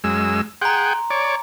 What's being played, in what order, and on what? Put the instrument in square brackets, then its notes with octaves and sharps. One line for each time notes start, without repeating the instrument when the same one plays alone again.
[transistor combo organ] F#2 G#3 E6
[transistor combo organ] G#4 F#5 G5 [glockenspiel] A#5 C6
[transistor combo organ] C#5 D5